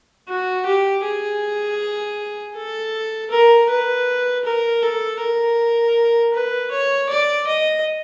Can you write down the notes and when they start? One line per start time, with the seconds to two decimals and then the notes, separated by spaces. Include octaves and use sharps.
0.28 F#4
0.66 G4
1.04 G#4
2.55 A4
3.31 A#4
3.69 B4
4.45 A#4
4.82 A4
5.20 A#4
6.33 B4
6.71 C#5
7.09 D5
7.47 D#5